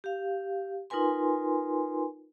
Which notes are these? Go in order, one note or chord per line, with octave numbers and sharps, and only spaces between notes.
G4 F5
D#4 F4 A#4 B4 G#5 C6